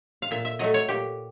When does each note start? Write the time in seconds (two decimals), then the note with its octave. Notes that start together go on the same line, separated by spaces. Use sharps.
0.22 F5
0.31 A#2 E5
0.45 E5
0.59 F#3 A3 D#5
0.74 C#5
0.89 A#2 G4